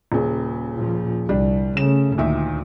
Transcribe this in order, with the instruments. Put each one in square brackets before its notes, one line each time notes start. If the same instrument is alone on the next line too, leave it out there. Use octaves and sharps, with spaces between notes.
[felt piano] D#1 C#3
[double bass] A#2 F3
[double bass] C2 [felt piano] G3 D4
[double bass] C#3 A3 [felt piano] E7
[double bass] D2 [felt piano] A#2 D#3 E5